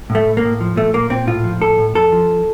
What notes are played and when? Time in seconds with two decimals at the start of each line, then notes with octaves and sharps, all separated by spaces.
0.10 A2
0.15 A3
0.26 A2
0.37 A#3
0.43 A2
0.60 F3
0.76 A#2 A3
0.94 A#2 A#3
1.10 A#2 C4
1.27 A2 F4
1.44 F3
1.61 A2 A4
1.78 A2
1.95 F2 A4
2.12 F3